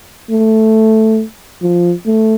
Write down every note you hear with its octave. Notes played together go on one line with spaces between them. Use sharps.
A3
F3
A3